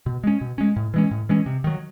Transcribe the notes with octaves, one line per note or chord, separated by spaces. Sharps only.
B2
G#3 C#4
B2
G#3 C#4
A2
E3 G#3 C#4
A2
E3 G#3 C#4
C3
D#3 F#3